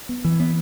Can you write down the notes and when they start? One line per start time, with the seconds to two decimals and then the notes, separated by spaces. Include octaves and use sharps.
0.09 B3
0.25 E3
0.40 B3